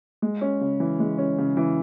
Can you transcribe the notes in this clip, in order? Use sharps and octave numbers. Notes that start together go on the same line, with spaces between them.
G#3
C#4
C#3
E3
G#3
C#4
C#3
E3